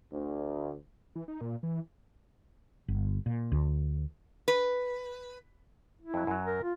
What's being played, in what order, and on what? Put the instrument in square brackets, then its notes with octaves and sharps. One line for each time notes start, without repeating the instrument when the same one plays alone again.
[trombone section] D2
[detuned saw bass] E3
D#4
A#2
E3
[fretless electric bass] G1
A#2
D2
[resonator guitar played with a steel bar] B4
[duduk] E4
[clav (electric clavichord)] F2 F#3
F#2 F#3
[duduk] A#4
F4